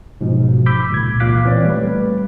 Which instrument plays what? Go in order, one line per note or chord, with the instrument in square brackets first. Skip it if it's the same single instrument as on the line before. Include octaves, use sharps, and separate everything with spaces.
[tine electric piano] G#2 B2 F3
B5 D6 E6 G6 B6
C#2 A#2 G#6
A1 A#2 F5 D6 F#6 B6
E3 C4 C#5 D5
G3 A3 B4